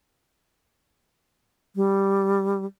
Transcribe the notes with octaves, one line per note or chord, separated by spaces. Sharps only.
G3